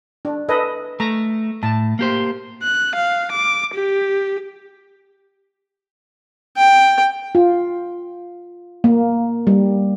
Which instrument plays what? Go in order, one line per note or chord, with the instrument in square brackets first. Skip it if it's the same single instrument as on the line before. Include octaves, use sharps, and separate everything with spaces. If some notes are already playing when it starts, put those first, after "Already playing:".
[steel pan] D4
A4 B4 D#5
[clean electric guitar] A3 [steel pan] A#5
[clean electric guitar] A2 [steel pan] A5
[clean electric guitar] A#3 G4 C5
[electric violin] F#6
F5
D6
G4
[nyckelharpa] G5
[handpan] F4
A#3
G3